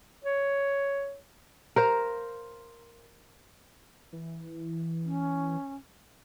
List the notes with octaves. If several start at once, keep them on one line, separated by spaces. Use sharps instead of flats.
C#5
A#4 C5 F5
E3
C#4